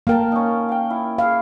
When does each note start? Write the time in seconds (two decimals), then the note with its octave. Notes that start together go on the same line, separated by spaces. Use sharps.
0.07 A#3 A#4 F5 G5 A5
0.32 C#4 D#4
0.69 F5 G5
0.90 E4
1.18 E4 G#4 F5